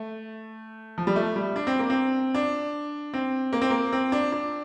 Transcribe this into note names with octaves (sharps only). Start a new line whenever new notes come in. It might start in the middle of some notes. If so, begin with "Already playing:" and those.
Already playing: A3
F3
G3
A3
G3
D4
C4
A#3
C4
D4
C4
A#3
C4
A#3
C4
D4
D4